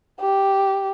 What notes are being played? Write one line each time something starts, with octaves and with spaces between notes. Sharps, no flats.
G4